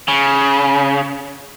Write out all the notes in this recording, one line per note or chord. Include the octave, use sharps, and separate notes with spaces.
C#3